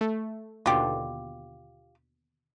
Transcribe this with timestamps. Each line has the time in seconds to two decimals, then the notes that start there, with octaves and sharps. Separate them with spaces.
0.01 A3
0.66 D#2 B2 D3 F4 G4